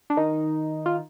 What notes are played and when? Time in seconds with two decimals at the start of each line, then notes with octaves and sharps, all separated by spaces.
0.10 D4
0.17 D#3 D#4
0.86 F4